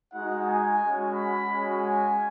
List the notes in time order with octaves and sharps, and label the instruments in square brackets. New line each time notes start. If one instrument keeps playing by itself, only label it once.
[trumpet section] G#3 D#4 F#4 F#5
G#5
G#3 C#4 F#4
B5
G#3 C#4 F#4
G#5